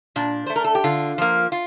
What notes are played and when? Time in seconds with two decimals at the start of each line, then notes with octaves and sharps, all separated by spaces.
0.16 A#2 D4
0.46 A3 C5
0.56 A#4
0.64 A4
0.75 G4
0.84 D3 F4
1.18 F3 A#3
1.52 F4